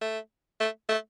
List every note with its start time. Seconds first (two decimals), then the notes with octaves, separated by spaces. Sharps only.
0.01 A3
0.60 A3
0.89 A3